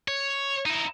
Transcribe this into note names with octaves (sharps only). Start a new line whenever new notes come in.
C#5
D#4 E4